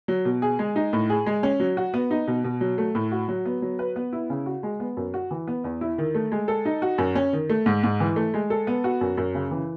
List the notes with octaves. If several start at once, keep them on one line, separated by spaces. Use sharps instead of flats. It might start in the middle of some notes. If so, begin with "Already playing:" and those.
F#3
B2
G#4
G#3
D#4
A2
G#4
G#3
C#4
F#3
F#4
B3
D#4
B2
B2
F#3
A3
A2
F#4
F#3
B3
F#3
B4
B3
E4
C#3
F#4
G#3
B3
F#2
F#4
E3
B3
E2
E4
D#3
A3
G#3
A4
D#4
F#4
F#2
C#4
D#3
A3
G#2
G#2
E3
A3
G#3
A4
B3
F#4
F#2
F#2
C#3
E3